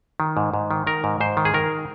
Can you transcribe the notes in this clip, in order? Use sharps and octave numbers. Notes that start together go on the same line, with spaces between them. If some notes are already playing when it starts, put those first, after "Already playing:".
D#3
G#2
G#2
D#3
D#3 A#4
G#2
G#2 C5
D#3
G#4
D#3 A#4